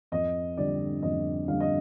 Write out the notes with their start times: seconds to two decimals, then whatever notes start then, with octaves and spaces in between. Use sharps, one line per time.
0.12 F2 D#5
0.57 D3 G3 D5
1.02 F2 D#5
1.48 D3 G3 F5
1.60 D#5